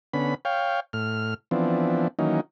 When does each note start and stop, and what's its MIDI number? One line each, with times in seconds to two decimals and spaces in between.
0.14 0.35 50
0.14 0.35 59
0.14 0.35 61
0.14 0.35 83
0.45 0.80 73
0.45 0.80 77
0.45 0.80 79
0.93 1.34 45
0.93 1.34 89
1.51 2.08 52
1.51 2.08 53
1.51 2.08 59
1.51 2.08 60
1.51 2.08 62
2.19 2.41 51
2.19 2.41 52
2.19 2.41 54
2.19 2.41 58
2.19 2.41 61
2.19 2.41 63